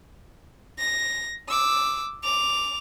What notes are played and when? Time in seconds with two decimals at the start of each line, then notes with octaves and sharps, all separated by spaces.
0.79 A#6
1.49 D6 E6
2.24 D6 F7